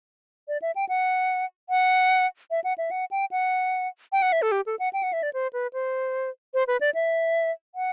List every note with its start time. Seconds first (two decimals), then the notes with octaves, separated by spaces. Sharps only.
0.48 D5
0.62 E5
0.76 G5
0.89 F#5
1.70 F#5
2.51 E5
2.64 F#5
2.78 E5
2.91 F#5
3.11 G5
3.31 F#5
4.12 G5
4.22 F#5
4.32 E5
4.42 A4
4.52 G4
4.66 A4
4.79 F#5
4.93 G5
5.03 F#5
5.13 E5
5.23 D5
5.33 C5
5.53 B4
5.73 C5
6.54 C5
6.68 B4
6.81 D5
6.95 E5
7.75 F#5